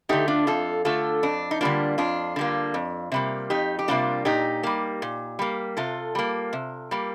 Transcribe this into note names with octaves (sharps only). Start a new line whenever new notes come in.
D3 A3 D#4 G4
D4 F4
F2 F4 A4
D3 A3 F4 A4
F2 D4
D#4
D3 G3 A#3 D4 F4
F2 D4 F4
D3 G3 A#3
F2
C3 G3 A#3
F2 D#4 G4
G4
C3 G3 A#3 D4 F4
A#2 D#4 G4
G3 A#3
A#2
G3 A#3
C3 F4 A4
G3 A#3
C3
G3 A#3